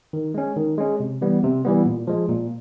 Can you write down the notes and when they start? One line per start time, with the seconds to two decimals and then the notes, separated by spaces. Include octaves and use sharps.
0.13 D#3
0.34 G#3 C#4
0.56 D#3
0.78 G#3 C#4
1.00 C3
1.21 E3 G3 B3
1.43 C3
1.65 E3 G3 B3
1.86 A#2
2.07 F3 G#3
2.29 A#2